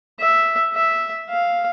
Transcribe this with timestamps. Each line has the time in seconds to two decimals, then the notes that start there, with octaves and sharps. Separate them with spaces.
0.19 E5
0.73 E5
1.29 F5